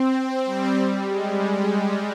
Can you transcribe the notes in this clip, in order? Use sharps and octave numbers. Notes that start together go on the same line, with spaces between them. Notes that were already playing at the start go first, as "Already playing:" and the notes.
Already playing: C4
G3
G#3